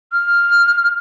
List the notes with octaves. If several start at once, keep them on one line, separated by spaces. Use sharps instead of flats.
F6